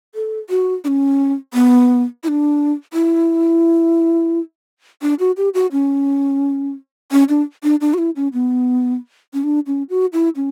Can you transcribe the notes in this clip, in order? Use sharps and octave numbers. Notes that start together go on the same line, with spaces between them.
A4
F#4
D4
C#4
B3
E4
D4
E4
D4
F#4
G4
F#4
C#4
C#4
D4
D4
D4
F#4
E4
C#4
B3
C#4
D4
C#4
F#4
E4
C#4